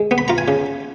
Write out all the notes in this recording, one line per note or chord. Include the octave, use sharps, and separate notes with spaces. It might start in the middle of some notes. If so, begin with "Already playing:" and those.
Already playing: G#3
B3
B5
F4 A#5
G#5
C#3